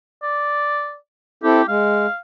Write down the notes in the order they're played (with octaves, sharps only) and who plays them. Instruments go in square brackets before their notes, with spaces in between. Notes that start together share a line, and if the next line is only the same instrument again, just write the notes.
[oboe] D5
[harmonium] C4 E4 A4 [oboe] G4
[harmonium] G#3 [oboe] F5